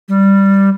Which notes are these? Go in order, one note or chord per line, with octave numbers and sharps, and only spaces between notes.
G3